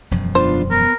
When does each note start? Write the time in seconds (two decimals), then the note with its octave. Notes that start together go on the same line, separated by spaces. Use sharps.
0.11 E1 F#2 F3
0.35 B3 D4 F4 C5
0.71 B3 A#4